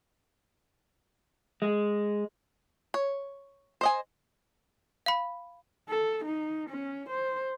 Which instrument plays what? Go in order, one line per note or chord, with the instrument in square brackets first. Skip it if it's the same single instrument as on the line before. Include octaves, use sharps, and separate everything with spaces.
[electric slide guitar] G#3
[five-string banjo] C#5
C5 D#5 G#5
[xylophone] F5 B5
[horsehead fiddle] A4
D#4
C#4
C5